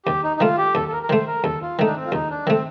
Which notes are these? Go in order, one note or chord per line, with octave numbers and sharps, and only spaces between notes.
D#2 G4
D#4
D#4
D#3 A3 F4
G4
D#2 A4
A4
A#4
A#4
D#3 A3 C5
A#4
D#2 A4
F4
D#3 A3 D#4
D4
C4
F4
D#2 D#4
D4
D#3 A3 C4